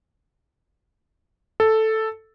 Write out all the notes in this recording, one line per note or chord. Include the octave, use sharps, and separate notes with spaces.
A4